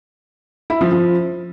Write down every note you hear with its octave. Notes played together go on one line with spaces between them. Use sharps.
E4
F3
F3